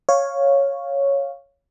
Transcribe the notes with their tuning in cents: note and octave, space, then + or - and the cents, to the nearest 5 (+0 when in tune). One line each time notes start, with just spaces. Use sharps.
C#5 +0 F5 +0